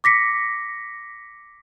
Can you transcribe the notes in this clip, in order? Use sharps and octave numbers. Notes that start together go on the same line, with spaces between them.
D6 A#6 B6 C#7